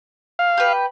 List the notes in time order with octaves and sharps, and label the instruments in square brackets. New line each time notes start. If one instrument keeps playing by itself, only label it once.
[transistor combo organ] F5
[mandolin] G4 B4